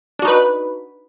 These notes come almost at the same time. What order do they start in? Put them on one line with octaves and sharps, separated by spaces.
D4 F#4 D#4 B4